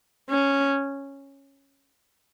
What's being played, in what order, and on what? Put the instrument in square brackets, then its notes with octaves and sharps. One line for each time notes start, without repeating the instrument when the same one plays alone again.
[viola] C#4